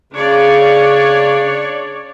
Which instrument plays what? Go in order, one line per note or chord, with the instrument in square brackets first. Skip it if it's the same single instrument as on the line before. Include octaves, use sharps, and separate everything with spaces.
[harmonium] C#3 [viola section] D4 C#5 D5